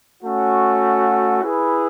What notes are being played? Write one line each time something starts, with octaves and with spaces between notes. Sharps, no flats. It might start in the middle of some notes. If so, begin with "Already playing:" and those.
A3 C#4 F#4
E4 G#4 B4